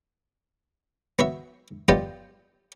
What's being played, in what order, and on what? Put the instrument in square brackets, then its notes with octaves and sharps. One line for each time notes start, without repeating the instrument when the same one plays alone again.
[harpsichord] B3 F#4 E5
B3 F4 G4 D5 D#5 G5